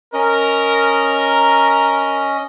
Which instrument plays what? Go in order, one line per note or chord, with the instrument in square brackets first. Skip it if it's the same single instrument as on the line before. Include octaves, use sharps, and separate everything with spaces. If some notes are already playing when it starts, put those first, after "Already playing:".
[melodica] C#4 D#5 [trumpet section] A#4